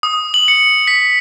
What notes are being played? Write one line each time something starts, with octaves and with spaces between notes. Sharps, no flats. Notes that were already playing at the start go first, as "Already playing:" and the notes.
D#6
F#7
C#7
B6